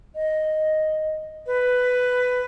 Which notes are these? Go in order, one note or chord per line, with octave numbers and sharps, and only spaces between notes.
D#5
B4